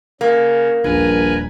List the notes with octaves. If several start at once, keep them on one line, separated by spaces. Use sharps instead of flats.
C#3 A#3
D#1 A#1 A#4 B4 G#5